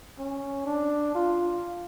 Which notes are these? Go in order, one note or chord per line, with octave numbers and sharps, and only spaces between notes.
C#4
D4
F4